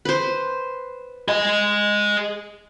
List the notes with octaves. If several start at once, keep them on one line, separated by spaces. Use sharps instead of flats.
B4 C5
G#4 D#5